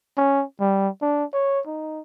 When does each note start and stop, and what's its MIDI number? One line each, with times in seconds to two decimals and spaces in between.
0.17 0.44 61
0.60 0.88 55
1.02 1.24 62
1.33 1.60 73
1.67 2.01 63